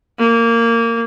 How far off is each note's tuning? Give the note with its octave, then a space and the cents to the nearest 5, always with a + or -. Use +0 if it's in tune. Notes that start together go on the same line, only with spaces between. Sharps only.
A#3 -15